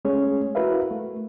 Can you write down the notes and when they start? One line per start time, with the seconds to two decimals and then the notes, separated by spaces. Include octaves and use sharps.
0.05 G#3 A3 C#4 G#4 C#5
0.55 E4 F#4 A#4 B4 E5 F5
0.91 A3